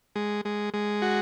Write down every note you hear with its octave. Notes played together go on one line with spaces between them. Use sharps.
G#3
G#3
G#3
F#4